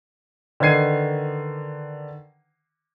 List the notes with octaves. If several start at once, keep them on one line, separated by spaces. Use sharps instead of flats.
D3 D#3 B4 G#6 C7 D#7